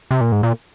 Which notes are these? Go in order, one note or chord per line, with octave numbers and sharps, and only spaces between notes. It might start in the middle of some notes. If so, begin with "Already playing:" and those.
C3
A#2
G#2
A#2